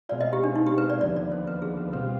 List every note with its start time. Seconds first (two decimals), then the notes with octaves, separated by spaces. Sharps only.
0.09 B2 G#3 C4 F4 D5
0.21 D#5
0.33 G4
0.44 D4
0.56 D#4
0.67 G4
0.78 B4
0.90 D5
1.01 D#2 D3 F3 B3 D5
1.16 D5
1.32 C5
1.47 B4
1.62 G#4
1.77 B4
1.93 B2 G3 C4 F4 B4